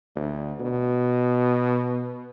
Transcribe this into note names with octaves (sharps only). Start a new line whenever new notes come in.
D2
B2